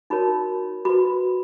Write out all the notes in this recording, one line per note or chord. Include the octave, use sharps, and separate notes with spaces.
D#4 F#4 A#4 C#5 B5
F#4 B4 B5